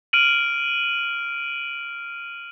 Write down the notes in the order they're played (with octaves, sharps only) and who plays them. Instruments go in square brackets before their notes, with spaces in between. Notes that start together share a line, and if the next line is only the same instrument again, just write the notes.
[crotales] F6 D7 D#7 F#7